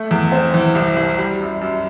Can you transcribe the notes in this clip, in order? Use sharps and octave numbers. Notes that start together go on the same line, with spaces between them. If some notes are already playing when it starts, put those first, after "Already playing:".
Already playing: A3
E2
C4
E3
C2
C2
G3
F#2
F#2